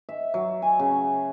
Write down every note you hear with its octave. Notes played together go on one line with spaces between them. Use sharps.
E5
F#3
G#5
C#3